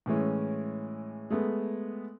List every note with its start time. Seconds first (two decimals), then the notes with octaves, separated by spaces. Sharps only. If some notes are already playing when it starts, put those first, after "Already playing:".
0.06 A2 E3 G#3 C#4
1.30 G#3 A3 B3